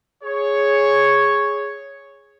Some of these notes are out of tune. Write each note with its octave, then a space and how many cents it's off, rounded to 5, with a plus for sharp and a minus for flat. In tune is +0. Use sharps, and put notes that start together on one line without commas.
G#4 +0 C#5 +0